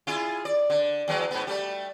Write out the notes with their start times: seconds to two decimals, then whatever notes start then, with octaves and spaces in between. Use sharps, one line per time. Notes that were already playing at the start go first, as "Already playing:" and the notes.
0.07 E4 F4 G#4
0.45 D5
0.70 D3
1.08 E2 F#3 G#3
1.31 G#2 B3
1.47 G3 A3